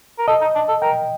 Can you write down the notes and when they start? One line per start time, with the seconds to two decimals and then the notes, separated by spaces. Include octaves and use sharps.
0.18 A#4
0.28 A4 D#5
0.41 D#4
0.55 D4
0.68 A4
0.82 A#4 G5